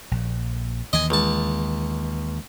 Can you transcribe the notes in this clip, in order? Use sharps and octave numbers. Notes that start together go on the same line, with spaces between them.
A#1
D#2 E3 D#5 G#5
C#2 A5